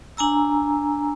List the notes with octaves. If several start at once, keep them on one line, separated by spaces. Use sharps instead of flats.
D4 G#5 A#5 E6